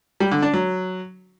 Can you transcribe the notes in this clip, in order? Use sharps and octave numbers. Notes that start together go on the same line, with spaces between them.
G3
D3
D4
F#3